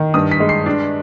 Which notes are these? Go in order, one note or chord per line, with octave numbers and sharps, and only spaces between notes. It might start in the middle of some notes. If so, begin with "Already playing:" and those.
Already playing: D#3
G2 D#6
B6
G#3
C7
D4